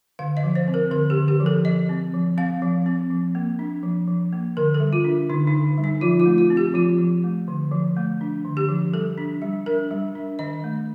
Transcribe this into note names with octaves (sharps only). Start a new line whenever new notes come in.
D3 F5
D#5
F3
C5
C4
A#4
D3 A#4
G4
D3
G4
F3
A4
F3 D#5
C4
F3
C4 F5
F3
C4
F3
A#3
D4
F3
F3
A#3
D3 A#4
A4
G3
F4
D4
D3 D#4
D#4
D3
G3
D#4
F3 F4
F4
A3
F4
C4
G4
F3 F4
F3
A3
D3
F3
A3
D4
D3
G4
F3
G3 A4
D4
G3
D4 A#4
G3
D4
D#3 D#5
A3